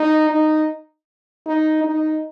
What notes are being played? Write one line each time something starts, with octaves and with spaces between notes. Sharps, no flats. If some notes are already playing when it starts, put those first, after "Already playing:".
Already playing: D#4
D#4
D#4
D#4